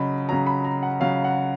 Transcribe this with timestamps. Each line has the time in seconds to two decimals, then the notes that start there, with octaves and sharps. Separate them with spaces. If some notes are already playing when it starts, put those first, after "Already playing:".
Already playing: C#3 F#3 D#5 B5
0.29 C#3 F#3 A#5
0.46 B5
0.64 A#5
0.83 F#5
1.00 C#3 F#3 F5
1.24 F#5